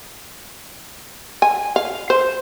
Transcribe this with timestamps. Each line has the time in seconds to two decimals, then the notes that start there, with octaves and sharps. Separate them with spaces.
1.42 G#5
1.76 F5
2.10 C5